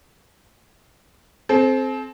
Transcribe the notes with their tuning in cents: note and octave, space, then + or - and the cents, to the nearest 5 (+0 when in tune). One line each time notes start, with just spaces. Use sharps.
C4 +0 A4 -40